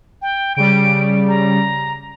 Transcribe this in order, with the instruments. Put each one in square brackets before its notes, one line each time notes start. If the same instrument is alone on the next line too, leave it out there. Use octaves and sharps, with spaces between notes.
[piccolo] G5
[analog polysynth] C#3 G3 [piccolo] D7
[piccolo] A#5